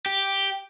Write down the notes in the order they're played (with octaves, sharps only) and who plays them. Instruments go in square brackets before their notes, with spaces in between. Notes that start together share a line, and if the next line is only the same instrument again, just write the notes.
[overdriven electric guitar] G4